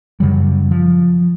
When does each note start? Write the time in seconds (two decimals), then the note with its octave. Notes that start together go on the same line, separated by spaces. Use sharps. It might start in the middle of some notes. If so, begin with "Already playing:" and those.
0.20 F#2 C#3 F#3 G3
0.71 F3